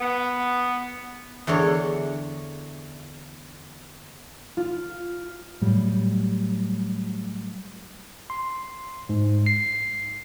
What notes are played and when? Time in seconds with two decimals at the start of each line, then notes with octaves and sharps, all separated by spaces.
0.01 B3
1.47 E2 D3 A#4 C#5
4.57 F4
5.62 A2 F#3 G3
8.30 C6
9.09 G#2
9.46 C7